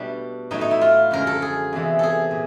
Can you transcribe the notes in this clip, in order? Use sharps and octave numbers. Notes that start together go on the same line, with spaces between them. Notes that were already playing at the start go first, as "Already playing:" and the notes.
Already playing: B2 G3 A3 D4
A2 F#3 A3 D#4
D#4
E4
F4
F#2 D3 F3 G#3 A#4
A4
G#4
E2 C3 E3 G#3
G#4 A4
A#2